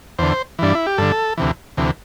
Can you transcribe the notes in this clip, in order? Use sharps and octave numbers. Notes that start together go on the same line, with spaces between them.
E2 D3 C5
G2 E3 D4
E4
G4
G2 D3 A4
D2 C3 E3
D2 C3 E3